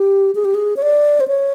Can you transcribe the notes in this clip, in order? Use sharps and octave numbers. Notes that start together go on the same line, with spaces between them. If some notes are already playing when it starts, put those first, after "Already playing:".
Already playing: G4
G#4
G4
G#4
C#5
D5
C5
C#5